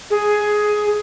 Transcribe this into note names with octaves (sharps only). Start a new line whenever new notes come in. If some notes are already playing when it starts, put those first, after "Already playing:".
G#4